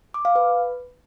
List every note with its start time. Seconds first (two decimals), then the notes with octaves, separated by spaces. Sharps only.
0.14 D6
0.25 F5
0.35 B4